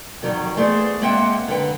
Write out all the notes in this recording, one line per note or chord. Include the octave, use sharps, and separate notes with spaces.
F2 D#3 F#3 G3
E3 A3 B3 G#4 C5 D5
G#3 A#3 C4 E5 F#5 G5
F#2 D3 B4 G5